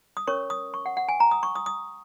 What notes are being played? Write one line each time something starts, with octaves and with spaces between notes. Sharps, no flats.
D#6
C#4 A#4 C#5 C#6
D#6
C#6
F#5
F#5
G#5
A#5
D#6
C#6
D#6
D#6